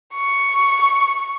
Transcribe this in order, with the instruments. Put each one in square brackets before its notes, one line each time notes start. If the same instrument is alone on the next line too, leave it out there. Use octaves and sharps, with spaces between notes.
[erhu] C#6